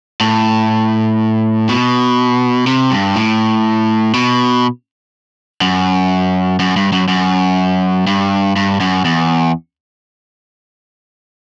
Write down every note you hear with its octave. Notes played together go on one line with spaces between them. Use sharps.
A2
B2
C3
G2
A2
B2
F#2
F#2
G2
F#2
F#2
G2
G2
F#2
E2